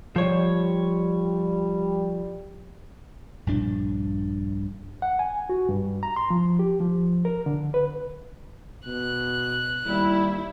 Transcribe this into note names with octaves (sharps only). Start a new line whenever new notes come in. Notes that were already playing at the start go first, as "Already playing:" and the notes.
F3 G3 C#5
A#1 G2 D4
F#5
G#5
F#4
G2
A#5
C6
F3
G4
F3
A#4
D3
B4
B2 F#6
D#2 G3 E4